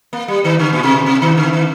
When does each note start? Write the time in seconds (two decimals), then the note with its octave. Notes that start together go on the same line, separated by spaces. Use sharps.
0.13 A#3
0.28 G3
0.44 D#3
0.59 D3
0.73 A#2
0.83 C3
1.06 C3
1.22 D#3
1.37 D3
1.53 D#3